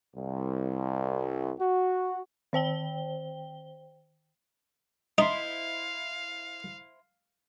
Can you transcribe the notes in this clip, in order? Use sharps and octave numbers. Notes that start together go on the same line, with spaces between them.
C2
F#4
D#3 C5 G5 G7
D#4 E4 C5 D#5 F5 C6